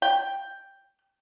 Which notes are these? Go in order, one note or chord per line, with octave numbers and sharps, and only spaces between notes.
G5